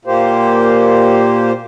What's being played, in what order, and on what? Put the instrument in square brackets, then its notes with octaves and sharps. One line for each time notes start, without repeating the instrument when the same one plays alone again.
[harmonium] A#2 A#3 G4 C5